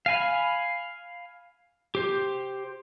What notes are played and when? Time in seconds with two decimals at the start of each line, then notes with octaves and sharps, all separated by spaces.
0.06 F5 G#5 B5
1.95 G4 C5